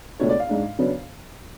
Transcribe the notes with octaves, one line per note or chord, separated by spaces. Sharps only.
C#2 B2 A3 D4 C#5
D5
F5
G#2 G#3 D4
C#3 F#3 B3 D4